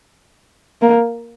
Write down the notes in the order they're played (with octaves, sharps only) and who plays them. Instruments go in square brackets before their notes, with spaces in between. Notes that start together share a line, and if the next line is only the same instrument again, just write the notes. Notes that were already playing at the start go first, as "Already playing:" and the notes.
[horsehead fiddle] A#3